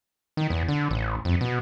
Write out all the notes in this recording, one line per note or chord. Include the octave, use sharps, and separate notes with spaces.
D#3
E2
D3
A1
F2
B2